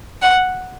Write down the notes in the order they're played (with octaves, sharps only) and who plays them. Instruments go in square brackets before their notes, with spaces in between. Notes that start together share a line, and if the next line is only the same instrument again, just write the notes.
[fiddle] F#5